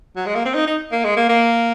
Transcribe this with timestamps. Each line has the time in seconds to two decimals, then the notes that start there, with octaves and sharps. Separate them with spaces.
0.16 F#3
0.26 G#3
0.35 A#3
0.45 C4
0.54 D#4
0.67 D#4
0.92 A#3
1.04 G#3
1.17 A#3
1.29 A#3